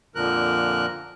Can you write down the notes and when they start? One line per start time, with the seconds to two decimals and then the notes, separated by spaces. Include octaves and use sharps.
0.15 F2 A#2 D3 F3 A#4 F#6